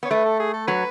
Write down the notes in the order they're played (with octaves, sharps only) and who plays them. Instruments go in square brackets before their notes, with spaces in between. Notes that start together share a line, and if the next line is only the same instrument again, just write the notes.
[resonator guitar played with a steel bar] B3
[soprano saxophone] C#5
[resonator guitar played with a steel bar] A3 [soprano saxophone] B4
[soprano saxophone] A4
G#4
A4
[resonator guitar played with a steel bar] F#3 [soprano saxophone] B4